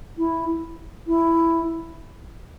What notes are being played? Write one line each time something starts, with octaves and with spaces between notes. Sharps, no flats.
E4
E4